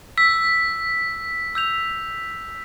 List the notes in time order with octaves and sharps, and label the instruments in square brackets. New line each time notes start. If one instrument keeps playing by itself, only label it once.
[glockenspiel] E6 [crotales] B6
[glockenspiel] E6 G6 F7